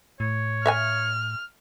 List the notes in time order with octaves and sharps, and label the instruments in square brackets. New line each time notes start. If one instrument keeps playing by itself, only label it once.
[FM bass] A2 [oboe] C#5
[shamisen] E5 F5 G#5 [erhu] F6